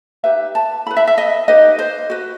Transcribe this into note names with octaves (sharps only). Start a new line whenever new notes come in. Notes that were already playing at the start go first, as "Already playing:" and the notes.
D#4 G4 B4 E5
A5
E4 B4 B5
E5
E5
D#5
D#4 G4 B4 D#5
C5
F#4 B4